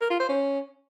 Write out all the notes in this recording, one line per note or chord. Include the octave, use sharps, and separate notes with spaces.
A#4
F4
C5
C#4